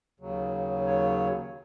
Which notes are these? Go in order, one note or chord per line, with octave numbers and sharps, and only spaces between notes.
D#2 C#3 F#3
C#5